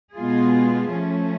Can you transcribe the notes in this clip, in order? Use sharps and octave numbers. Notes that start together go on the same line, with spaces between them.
B2 G#3 B3 F4 G#4
F3 A3 C#4